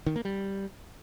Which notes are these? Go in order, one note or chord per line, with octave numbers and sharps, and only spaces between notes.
D#3
A#3
G3